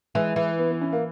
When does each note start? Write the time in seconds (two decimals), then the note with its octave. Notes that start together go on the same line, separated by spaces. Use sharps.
0.15 E3 G#3
0.36 E3
0.59 B3
0.70 B3
0.81 C#4
0.92 A#3